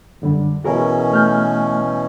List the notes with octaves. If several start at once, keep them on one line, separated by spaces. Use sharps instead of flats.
F#2 D3 G3
B2 E3 C#4 F#4 G#4 A#4
A3 F6 G6